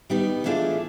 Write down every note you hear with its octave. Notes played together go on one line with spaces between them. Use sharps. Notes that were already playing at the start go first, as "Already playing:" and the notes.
D#3 G3 B3 D#4 G4
E3 A3 D4 F4 G#4